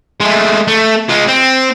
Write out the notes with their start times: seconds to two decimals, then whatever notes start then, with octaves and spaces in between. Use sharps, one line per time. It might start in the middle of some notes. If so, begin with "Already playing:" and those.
0.21 G#3 A3
0.68 A3
1.09 G#3 F4
1.28 C4